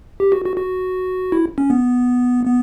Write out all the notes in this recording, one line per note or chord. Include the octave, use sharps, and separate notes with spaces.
G4
F#4
F#4
F#4
E4
C#4
B3
B3